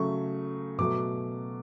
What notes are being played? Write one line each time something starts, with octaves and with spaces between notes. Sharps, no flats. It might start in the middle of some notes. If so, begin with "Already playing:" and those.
Already playing: C#3 F#3 A3 C#6
B2 F#3 A3 D6